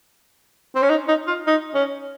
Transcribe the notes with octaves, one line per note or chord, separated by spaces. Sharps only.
C4
C#4
D#4
D#4
F4
D#4
C#4